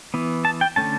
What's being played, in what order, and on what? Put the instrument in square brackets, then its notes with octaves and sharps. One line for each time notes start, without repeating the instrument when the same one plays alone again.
[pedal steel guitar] E3 B3
A5
G5
D3 A3 C#4 A5